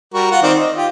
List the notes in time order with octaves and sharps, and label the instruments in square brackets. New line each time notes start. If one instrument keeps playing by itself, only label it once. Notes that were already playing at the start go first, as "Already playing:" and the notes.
[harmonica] G3 F#4 A#4
F4 F#5
D#3 C4 D5
D#5
F4 G4